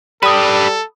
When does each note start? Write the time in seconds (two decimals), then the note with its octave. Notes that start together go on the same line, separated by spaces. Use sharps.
0.23 G3 G4 A4 B4 B5 D#6